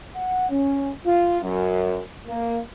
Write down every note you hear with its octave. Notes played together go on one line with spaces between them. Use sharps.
F#5
C#4
F4
F#2
A#3